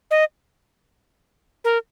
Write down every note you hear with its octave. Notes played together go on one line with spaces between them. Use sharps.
D#5
A#4